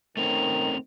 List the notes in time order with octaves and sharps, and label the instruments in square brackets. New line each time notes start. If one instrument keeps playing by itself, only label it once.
[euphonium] D#3 [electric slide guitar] A3 C4 C#4 [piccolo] F7